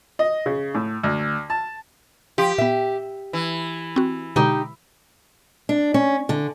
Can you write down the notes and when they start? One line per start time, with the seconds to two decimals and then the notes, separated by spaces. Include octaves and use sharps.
0.19 D#5
0.46 C#3
0.74 A2
1.03 D2
1.50 A5
2.38 F3 G4
2.58 A#2 B3 E5
3.33 E3
3.96 C4 F#4
4.36 B2 D3 G#3 D#4 G4
5.69 D4
5.94 C#4
6.29 D3